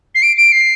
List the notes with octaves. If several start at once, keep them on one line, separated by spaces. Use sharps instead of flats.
C7
D7
D7
C7